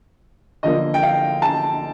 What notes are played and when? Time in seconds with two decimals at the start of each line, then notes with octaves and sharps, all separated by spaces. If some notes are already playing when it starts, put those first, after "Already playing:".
0.63 D3 F3 A#3 D#5
0.94 G5
1.03 F5
1.42 A5